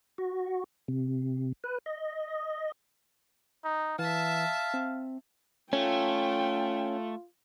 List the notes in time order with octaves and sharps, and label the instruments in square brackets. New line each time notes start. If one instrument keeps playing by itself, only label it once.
[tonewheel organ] F#4
C3
B4
D#5
[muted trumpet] D#4
[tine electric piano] E3 [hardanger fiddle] E5 A5 [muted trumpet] F5
[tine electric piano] C4
[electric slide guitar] A3 [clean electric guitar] C#4 [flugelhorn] F4 [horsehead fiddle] G5